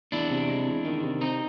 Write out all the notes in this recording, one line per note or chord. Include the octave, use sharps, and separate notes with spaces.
E2 D4 E4
C3
G#3
E2
D#3
C3
C4 D#4